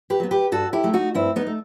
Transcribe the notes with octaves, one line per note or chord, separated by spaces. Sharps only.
G4 B4
F#3 B3
G4 B4
G2 F#4 A4
E4 G4
F#3 A3
D#4 F#4
G2 C4 E4
B3 D#4
A3